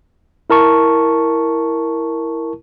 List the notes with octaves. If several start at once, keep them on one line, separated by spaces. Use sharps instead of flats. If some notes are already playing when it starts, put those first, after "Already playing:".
E4 A#4 A5 C#6